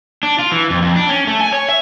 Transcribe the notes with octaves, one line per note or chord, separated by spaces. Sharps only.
D4
F4
E3
F2
F2
D4
C#4
A3
G#5
C#5
E5